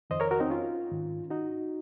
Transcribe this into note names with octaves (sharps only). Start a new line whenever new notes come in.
F2 D#3 C5 D#5
A#4 C#5
F#4 A#4
C4 D#4
C#4 F4
G#2 D#3
D#4 F#4